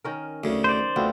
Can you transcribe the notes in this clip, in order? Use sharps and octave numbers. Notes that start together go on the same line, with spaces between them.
D#3 C#4 A#4
D2 C#3
C5 D5
D2 B3 C4 F4